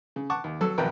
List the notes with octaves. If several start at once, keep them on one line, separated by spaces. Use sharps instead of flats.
C#3
F#5 A5 C#6 D6
D#2
F#3 A4 E6
G#1 F2 B2 A#4 B4 G5